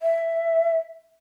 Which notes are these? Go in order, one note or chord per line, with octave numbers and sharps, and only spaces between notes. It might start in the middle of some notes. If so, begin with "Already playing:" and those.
E5